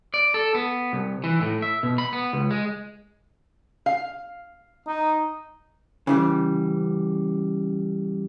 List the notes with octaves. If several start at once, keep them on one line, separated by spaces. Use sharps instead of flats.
D5
A4
B3
C2
E3
A2
E5
B2
B5
B3
C#2
G#3
F5
D#4
C#3 E3 G3